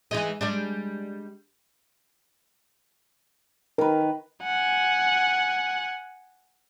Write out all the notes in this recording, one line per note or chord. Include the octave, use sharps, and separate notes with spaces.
E3 G#3 D#4
G3 G#3 D4
D#3 A#4 B4
F#5 G#5